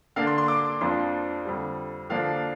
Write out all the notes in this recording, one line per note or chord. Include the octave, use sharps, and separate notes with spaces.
D3 A#3 D4 F5
C6
C6
D6
F2 F3 A#3 D4 C6
F2 D3 G3
D3 F3 A#3 D4 F5